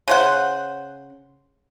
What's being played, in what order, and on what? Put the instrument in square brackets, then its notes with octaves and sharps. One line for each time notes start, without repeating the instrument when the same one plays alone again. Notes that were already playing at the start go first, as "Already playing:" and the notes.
[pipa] C#3 C5 F#5